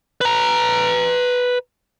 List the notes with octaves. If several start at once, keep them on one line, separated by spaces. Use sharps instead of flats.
B4 A#5